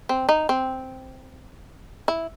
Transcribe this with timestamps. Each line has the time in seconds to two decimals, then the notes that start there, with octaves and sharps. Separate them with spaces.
0.09 C4
0.29 D#4
0.49 C4
2.08 E4